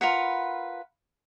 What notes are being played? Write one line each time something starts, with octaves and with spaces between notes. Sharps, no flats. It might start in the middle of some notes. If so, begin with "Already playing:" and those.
F4 A#4 B4 F#5